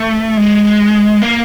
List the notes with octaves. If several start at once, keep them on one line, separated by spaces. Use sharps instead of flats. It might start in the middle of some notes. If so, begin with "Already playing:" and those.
Already playing: A3
G#3
A#3